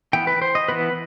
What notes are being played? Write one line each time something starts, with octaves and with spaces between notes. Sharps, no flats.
E3 B3 G5
B4
C5
D#5
E3 B3 B4